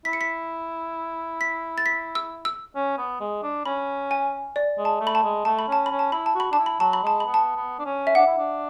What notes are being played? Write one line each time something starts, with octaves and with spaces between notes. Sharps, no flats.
E4 B6
C#7
B6
B6
A6
B6
E6
E6
C#4
B3
G#3
D4
C#4 B5
G#5
D5
G#3
A5
A3
B5
A5
G#3
A3 A5
B5
C#4 A5
C#4 B5
A5
E4 B5
A5
F#4 B5
D4 A5
E4
B5
F#3 A5
B5
G#3 A5
B5
B3
A5
B3
D4
C#4
E5
D4 F#5
E4
D4